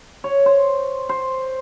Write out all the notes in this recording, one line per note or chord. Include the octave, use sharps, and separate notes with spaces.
C#5
C5
C5